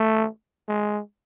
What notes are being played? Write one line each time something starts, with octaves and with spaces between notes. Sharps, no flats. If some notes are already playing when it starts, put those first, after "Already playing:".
Already playing: A3
G#3